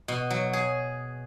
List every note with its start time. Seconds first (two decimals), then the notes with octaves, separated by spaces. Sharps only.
0.08 B2
0.30 F#3
0.53 G#4